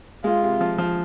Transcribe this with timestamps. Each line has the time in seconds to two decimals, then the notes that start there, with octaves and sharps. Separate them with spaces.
0.24 G#3 F4
0.43 C3
0.61 F3
0.78 F3